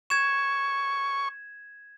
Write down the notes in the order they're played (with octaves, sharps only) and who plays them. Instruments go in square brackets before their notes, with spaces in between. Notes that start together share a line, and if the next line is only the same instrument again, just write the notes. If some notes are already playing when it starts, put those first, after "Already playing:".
[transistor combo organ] C#6 [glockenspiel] G#6 E7